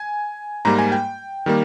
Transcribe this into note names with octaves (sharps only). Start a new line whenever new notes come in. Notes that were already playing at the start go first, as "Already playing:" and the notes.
Already playing: G#5
G#2 G3 A#3 A#5
G#5
G5
D#3 G3 A#3